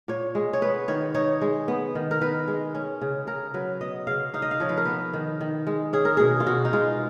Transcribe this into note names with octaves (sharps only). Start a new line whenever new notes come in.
A#2 C#5
G#3
C#5
B3 B4
D#3 C#5
D#4 C#5
G#3
B3
D#3
A#4
D#3 B4
G#3
C#4
C#3
C#3 A#4
F#3 B4
B3 D#5
C#3 F5
D#4 F5
D#5
F5
F3 C#5
B4
A#4
B3 B4
D#3
D#3
G#3
C#4 G#4
A#4
B2 G#4
F4
B2 F#4
D#4
G#3 F4